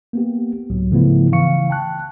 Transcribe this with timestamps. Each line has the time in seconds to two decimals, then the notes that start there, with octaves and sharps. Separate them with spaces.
0.13 A#3 B3 G4
0.70 C#2 A2 F#3
0.91 G#2 C#3 F3 A3 B3 E4
1.32 C#3 E3 F5 C#6 C#7
1.70 G5 A5 F#6